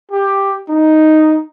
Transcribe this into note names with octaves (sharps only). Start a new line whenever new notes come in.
G4
D#4